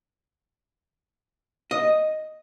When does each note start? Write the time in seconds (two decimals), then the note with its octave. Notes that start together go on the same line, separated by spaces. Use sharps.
1.71 D#5